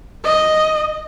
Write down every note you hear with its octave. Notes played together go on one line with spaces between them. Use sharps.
D#5